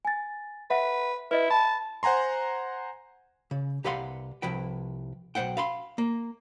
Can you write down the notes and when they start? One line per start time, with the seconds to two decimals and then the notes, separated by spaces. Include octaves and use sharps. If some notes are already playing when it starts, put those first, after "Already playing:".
0.05 G#5 A6
0.70 B4 E5 F#5
1.31 E4 B4 D#5
1.50 A5 B5
2.03 C5 F#5 G#5 A#5 C6
3.51 C#3
3.84 C2 G4 B4 F5 F#5 C6
4.42 C2 F3 B4 G5
5.35 B1 G2 C5 F#5 G5
5.57 F5 B5 C6
5.98 A#3